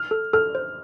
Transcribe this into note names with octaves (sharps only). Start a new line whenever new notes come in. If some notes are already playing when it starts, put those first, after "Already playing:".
Already playing: F6
A4
A4 F6
C5